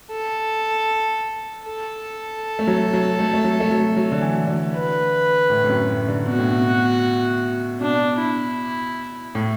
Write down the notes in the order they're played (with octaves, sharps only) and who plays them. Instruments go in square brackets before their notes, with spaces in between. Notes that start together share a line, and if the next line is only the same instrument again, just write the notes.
[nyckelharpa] A4
A4
[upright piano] A3
F#3
F#3
A3
A3
F#3
A3
F#3
F#3
D3
E3
D3
[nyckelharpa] B4
[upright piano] A2
A2
F#2
A2
D3
[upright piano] B2 [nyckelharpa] F#4
[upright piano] A2
B2
[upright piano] B2 [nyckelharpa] D4
[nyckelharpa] E4
[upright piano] A2